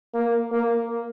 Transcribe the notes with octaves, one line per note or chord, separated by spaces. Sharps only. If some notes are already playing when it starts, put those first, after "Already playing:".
A#3
A#3